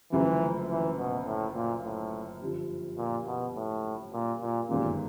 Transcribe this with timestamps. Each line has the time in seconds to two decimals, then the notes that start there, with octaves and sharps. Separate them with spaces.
0.12 F#1 F#2 D3 E3 F3 A3
0.70 E3
0.98 B2
1.26 A2
1.55 A#2
1.84 A2
2.41 G2 D3 F3
2.98 A#2
3.26 B2
3.55 A2
4.13 A#2
4.41 A#2
4.69 G1 F#2 A#2 D#3 G#3